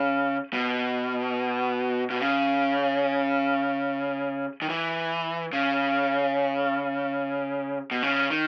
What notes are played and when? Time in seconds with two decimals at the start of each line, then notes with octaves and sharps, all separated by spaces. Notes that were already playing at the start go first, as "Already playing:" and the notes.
Already playing: C#3
0.53 B2
2.10 B2
2.20 C#3
4.62 D#3
4.69 E3
5.53 C#3
7.91 B2
8.03 C#3
8.30 D#3